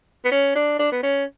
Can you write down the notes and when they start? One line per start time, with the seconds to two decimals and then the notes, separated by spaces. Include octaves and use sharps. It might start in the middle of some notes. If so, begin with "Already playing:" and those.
0.25 B3
0.31 C#4
0.55 D4
0.79 D4
0.92 B3
1.03 C#4